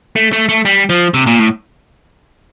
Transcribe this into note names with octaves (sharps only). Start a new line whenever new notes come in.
A3
A3
A3
G3
F3
C3
A#2
A2